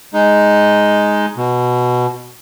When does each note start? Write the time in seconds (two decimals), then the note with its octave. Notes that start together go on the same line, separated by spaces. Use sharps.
0.14 G#3 D#4
1.37 B2